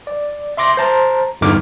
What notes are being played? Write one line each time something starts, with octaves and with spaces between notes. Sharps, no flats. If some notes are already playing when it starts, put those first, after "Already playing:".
D5
E5 C6 D6 A#6
C5 A5 A#5
G1 E2 D3 D#4 D6 F6